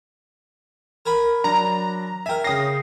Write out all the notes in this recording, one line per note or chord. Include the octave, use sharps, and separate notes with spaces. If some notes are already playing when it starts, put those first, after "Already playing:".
A#4 G#5 B5
F#3 D4 A#5
A#4 E5 G5 G#5
C#3 C#4 G5 D#6 A#6 C7